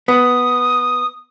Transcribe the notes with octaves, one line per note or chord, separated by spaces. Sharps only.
B3 D#6